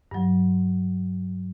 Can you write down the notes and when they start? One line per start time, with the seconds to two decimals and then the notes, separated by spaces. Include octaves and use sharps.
0.11 G2 F#3